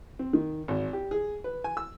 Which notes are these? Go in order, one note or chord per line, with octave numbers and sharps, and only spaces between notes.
C4
D#3
G#1
G4
G#4
B4
G#5
E6